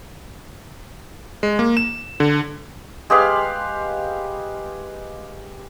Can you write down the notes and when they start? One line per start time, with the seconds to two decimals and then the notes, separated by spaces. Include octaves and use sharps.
1.43 G#3
1.59 A#3
1.77 E7
2.20 D3
3.10 G#3 G4 B4 F5